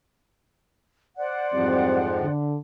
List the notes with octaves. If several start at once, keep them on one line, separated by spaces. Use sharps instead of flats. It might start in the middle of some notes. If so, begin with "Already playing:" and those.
C5 D5 F#5
F2 G#2 E3 F3 G3 C4
D3